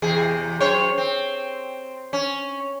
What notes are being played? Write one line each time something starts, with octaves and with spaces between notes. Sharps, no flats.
E2 C3 G#4
F#2 C5 C#5
C4
C#4